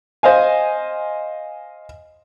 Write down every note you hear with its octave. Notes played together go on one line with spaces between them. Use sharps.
C5 D#5 F5 G#5